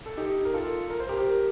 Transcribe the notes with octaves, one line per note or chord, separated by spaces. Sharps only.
A4
D#4 G4
A#4
F4 A4
A#4
C5
G4 A#4